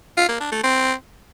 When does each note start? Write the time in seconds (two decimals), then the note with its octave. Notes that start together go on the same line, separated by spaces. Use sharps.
0.17 F4
0.29 A#3
0.40 D4
0.52 A3
0.63 C4